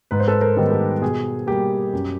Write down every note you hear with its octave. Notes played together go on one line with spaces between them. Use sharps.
G#2 B4
C5
A4 B4
A#4 C5
D#3 G3 B3 D#4
G4 A4
B2 G#4
G3 A#3 G4
F#2